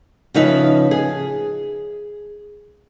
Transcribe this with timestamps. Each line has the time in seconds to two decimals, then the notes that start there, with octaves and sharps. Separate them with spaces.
0.34 C#3 F3 D#4 B4 E5
0.91 G#4